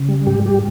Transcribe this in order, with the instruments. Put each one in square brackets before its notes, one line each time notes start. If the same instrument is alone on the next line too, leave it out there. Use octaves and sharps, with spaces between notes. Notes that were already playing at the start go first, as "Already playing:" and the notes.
Already playing: [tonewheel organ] C#3
G3
G#2 G4
G3 G4